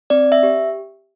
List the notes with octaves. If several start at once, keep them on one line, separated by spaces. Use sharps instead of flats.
C4 D5
E5
G4